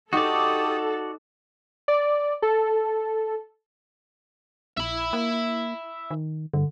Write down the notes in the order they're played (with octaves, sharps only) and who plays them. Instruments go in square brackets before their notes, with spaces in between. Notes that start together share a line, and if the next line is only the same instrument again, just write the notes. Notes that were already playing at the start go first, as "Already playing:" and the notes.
[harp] D#4 [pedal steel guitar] F#4 D5 [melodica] G4 D#6 [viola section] A4
[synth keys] D5
A4
[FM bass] A#1 [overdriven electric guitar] E5 B5
[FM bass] A#3
D#3
[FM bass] G2 [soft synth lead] D3